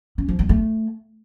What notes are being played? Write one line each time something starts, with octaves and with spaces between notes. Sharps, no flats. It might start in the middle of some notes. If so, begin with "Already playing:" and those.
C#4
F3
G#3
A3